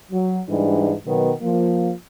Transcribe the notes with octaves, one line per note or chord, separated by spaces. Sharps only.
F#3
G#2 E3 G3 D4
B2 D#3 F#3 B3
F3 A#3